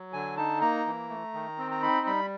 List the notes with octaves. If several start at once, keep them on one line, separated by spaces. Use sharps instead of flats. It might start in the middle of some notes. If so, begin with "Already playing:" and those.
Already playing: F#3
D3 G#5
D#4 A5
A#3 A#5
E3
A3
D#3
C4
A#5
D#4 B5
G3 B5